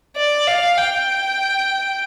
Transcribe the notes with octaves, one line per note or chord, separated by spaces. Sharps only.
D5
F5
G5